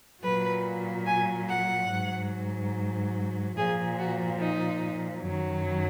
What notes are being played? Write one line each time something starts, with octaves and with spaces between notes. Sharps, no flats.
A#2 F#3 B4
G#5
F#5
G#2 F#3
A#2 F3 G#4
F#4
D#4
F#2 D#3 F#3